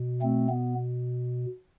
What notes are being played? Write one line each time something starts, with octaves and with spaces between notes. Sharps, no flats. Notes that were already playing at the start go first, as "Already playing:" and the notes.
Already playing: B2
A3 C4
B3